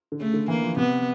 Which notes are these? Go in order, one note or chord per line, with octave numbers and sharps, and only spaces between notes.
D3
C#3 A3
D3
E3 A#3
F3
C3 B3